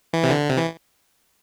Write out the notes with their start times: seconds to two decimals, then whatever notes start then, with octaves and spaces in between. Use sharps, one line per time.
0.13 E3
0.24 C3
0.30 D3
0.49 C3
0.57 E3